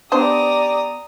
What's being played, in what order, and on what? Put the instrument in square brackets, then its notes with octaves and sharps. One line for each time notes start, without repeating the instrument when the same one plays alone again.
[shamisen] B3 D4 C5 [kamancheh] G4 D5 [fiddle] A#5 D#6